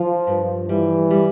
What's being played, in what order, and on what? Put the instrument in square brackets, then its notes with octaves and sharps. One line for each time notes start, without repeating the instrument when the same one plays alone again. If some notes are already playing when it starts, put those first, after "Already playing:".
Already playing: [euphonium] F3 [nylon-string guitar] F4
[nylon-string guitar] G2
[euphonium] E3 [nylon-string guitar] G3
[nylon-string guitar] G3